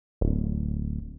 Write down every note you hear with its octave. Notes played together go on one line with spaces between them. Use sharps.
D1